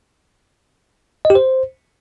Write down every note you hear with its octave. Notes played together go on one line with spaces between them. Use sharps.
D#5
G4
C5